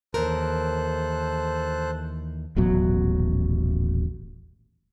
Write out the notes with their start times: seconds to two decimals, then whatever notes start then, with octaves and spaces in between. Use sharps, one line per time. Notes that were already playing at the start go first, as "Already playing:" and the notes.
0.14 D#2 E3 A4 A#4 C5 F#6
2.56 D#1 A1 B2 F#3